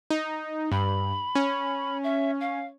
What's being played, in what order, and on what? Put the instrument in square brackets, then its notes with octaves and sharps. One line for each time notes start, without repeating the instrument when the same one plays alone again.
[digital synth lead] D#4
[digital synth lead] G2 [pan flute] B5
[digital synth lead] C#4
[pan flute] E5
F5